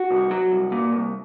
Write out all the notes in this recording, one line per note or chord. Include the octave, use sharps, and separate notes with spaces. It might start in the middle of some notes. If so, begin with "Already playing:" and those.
Already playing: F#4
C2
F#3
C2
A#2
C2